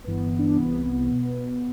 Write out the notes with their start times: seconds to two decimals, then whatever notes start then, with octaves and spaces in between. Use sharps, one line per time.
0.04 G1 G2 E3 B3
0.39 D4
0.56 C2 C3 E3 B3
1.11 B2